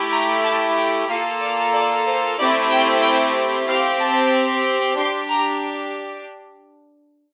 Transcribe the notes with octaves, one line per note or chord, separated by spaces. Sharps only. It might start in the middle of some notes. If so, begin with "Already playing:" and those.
Already playing: A3 E4 G4
A#5
A5
G5
A#3 F4 A4 F5
D5
D5
C5
A3 C4 E4 G4 D5
G5
G5
C4 G4 F5
A5
D4 G4 C6
A#5